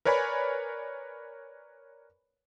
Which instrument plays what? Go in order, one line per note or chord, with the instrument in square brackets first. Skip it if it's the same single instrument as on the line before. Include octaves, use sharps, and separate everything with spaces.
[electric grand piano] A#4 B4 C#5 D5 G#5 B5